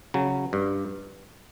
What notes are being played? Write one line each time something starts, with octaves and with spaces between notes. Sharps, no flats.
C#3 F#3
G2